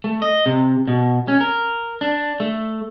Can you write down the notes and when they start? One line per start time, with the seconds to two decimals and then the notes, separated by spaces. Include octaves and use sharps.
0.04 A3
0.22 D#5
0.46 C3
0.88 B2
1.28 C#4
1.41 A#4
2.01 D4
2.40 A3